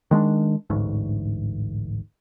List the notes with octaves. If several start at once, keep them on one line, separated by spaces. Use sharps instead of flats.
D#3 G#3 B3 D4
A1 D2 G#2